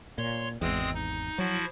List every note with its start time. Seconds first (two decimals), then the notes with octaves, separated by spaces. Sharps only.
0.18 A#2 C#5 C6
0.62 G#1 E2 G#3 C4 D#6
0.94 D#4
1.38 F3 F#3 E4 F#4